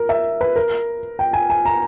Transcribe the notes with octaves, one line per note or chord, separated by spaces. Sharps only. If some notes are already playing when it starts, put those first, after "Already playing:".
Already playing: A#4
E5
B4
A#4
G5
G#5
G#5
A#5